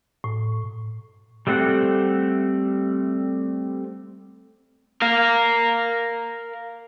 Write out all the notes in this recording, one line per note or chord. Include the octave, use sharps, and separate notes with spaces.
A2
G3 A3 C4 A4 F#5
A#4 F5